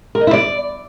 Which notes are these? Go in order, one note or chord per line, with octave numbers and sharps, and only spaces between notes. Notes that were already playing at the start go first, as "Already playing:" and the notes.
A#4
D#5
E4
D5